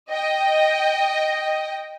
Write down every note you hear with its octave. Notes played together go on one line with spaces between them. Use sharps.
D#5 G5